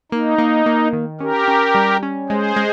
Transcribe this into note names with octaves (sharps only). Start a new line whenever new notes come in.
A#3 D#4
A#3
A#3
D#3
C#4 G4 A#4
C#4
G3
C#4
G#3 G#4 C5
G#3